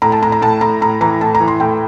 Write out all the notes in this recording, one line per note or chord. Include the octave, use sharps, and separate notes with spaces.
A2 A#5
A5
A2 A#5
A#5
A2 A5
A2 A#5
A2 A#5
E3 A#5
A2 A5
A#5
E3
C6
A2 G5